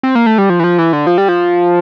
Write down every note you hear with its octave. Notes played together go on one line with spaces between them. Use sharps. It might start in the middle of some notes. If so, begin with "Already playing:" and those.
C4
A#3
A3
G3
F3
E3
F3
E3
D3
F3
G3
F3